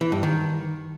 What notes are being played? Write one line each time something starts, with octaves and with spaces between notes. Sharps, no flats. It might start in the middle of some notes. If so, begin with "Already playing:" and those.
E3
G2
D#3